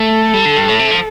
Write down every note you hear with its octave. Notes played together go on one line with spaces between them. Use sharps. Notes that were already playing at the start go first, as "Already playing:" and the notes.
Already playing: A3 A4
G3
D3
G2
A2
C3
F3